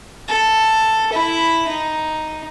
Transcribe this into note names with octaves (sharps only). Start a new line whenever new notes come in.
A4
E4 B5
D#4